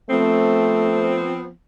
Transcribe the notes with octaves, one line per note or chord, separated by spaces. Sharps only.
F3 A3 B3 C4